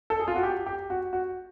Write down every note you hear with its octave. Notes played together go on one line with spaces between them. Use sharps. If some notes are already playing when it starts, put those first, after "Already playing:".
A4
G#4
F4
F#4
G4
G4
F#4
F#4